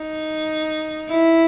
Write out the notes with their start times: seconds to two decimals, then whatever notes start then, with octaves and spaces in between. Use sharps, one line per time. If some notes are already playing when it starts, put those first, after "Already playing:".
Already playing: D#4
1.09 E4